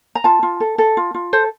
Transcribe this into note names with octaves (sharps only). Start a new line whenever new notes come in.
A#5
F4 A5
F4
A4
A4
F4
F4
A4 C5